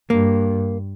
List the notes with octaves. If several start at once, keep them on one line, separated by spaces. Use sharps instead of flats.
G2 A#3